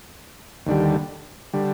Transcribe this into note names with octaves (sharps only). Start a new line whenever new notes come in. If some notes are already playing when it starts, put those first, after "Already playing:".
D#2 D3 G3
D3 G3